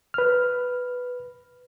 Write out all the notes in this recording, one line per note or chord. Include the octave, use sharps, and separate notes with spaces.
B4 F6